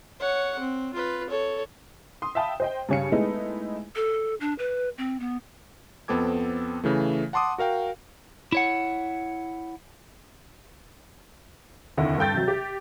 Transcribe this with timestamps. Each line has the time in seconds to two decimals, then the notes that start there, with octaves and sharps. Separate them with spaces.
0.20 C#5 F#5
0.59 C4
0.93 F4 B4
1.30 A4 C#5
2.22 C6 D#6
2.35 E5 F5 G5 A5 B5 D#6
2.60 C5 D#5 G5
2.89 G2 C#3 C#5 F5 C#7
3.12 G#3 A3 B3 D#4 E4 G#4
3.95 A4
4.40 D4
4.59 B4
4.98 C4
5.20 B3
6.08 F2 B3 C4 A4 D6 G#6
6.84 C#3 E3 A3
7.33 F#5 A5 C6 D6 D#6
7.58 F#4 A#4 F5 G5
8.52 E4 C#5 F#5
11.97 F1 D#2 D3 E4 F#5
12.18 G2 A4 G5 G6 A6
12.34 C3 F#3
12.48 G4